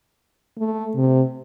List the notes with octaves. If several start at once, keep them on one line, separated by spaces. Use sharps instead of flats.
A3
C3